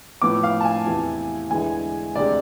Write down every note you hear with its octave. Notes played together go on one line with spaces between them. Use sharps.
A2 F3 B3 D6
F5
A5
G#5
E2 C3 E3
E2 D3 G#3 B3 E4 G#5
D2 C3 G#3 D5